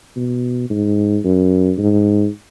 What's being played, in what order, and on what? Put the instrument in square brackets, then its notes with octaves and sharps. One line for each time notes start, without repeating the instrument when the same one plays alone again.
[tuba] B2
G#2
F#2
G#2